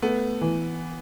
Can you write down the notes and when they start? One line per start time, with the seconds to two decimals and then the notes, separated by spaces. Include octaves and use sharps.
0.02 A3 B3
0.41 E3